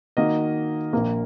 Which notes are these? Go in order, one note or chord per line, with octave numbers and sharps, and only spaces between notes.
D#3 A#3 F#4 D#5
A#1 A#2 A#3